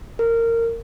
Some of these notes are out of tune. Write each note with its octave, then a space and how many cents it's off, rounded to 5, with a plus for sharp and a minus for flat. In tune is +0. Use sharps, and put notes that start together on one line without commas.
A#4 -20